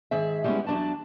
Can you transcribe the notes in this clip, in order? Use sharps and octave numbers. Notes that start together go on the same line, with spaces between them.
G#2 D#3 G#4 E5
G3 G#3 A#3 B3 C#4 E4
E2 F#3 D4 D5 A5